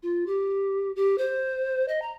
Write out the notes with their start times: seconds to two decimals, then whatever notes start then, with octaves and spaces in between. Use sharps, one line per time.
0.03 F4
0.27 G4
0.96 G4
1.18 C5
1.88 D#5
2.02 A#5